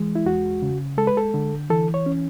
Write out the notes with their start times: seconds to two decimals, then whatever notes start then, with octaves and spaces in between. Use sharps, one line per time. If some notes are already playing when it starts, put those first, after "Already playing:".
Already playing: E3 G#3
0.15 E4
0.26 E2 F#4
0.62 C#3
0.98 G#3 A4
1.07 B4
1.17 A4
1.34 D3
1.70 E3 A4
1.94 C#5
2.06 C#4